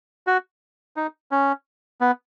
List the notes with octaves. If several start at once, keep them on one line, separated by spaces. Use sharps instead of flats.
F#4
D#4
C#4
B3